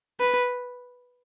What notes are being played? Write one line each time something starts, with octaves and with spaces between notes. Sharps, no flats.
B4